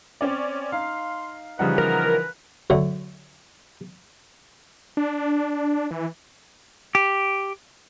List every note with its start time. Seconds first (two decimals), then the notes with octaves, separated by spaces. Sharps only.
0.21 C4 C#4 D5
0.72 D#4 F5 C6
1.59 C#3 E3 F3 G3 D#4 B4 F#5
1.78 A#4
2.70 D3 F#3 A3 C#5
4.97 D4
5.91 E3
6.95 G4